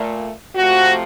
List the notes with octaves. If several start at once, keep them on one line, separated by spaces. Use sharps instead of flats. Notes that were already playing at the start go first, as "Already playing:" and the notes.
Already playing: A#2 A3
C3 F3 A3 F#4